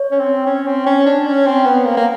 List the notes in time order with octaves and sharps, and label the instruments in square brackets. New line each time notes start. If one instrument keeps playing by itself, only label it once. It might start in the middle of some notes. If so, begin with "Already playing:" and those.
Already playing: [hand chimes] C#5
[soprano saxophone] C#4
C4
C#4
C4
C#4
D4
C#4
C4
B3
A#3
A#3